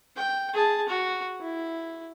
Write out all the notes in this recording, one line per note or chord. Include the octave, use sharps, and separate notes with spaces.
G5
G#4 A5
F#4
E4